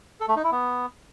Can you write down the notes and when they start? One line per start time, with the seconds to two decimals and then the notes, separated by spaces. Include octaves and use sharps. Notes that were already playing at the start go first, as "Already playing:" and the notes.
0.20 A4
0.28 A3
0.36 D#4
0.44 E4
0.52 B3